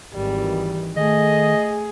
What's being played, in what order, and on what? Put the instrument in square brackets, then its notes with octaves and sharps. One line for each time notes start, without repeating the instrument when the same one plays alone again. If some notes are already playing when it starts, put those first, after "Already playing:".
[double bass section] G#1 D#3 E3 [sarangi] G3
[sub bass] D#3 [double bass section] A3 [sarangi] G#4 [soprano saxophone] D#5